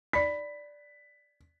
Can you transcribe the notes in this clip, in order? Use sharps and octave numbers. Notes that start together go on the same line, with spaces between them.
D5 B5 B6